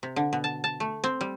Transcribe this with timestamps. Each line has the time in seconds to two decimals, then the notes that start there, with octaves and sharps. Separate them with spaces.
0.03 C3
0.16 D3
0.33 B2
0.44 A5
0.64 A5
0.80 A3
1.04 C4
1.21 G3